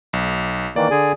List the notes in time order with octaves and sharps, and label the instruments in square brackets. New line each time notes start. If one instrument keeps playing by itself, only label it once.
[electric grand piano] B1
[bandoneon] D#3 E3 A#3 [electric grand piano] D5
[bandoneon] D3 G#4 G#5